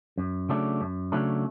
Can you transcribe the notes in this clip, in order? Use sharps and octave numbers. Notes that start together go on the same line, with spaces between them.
F#2
C#3 F#3 A3 D4
F#2
C#3 F#3 A3 D4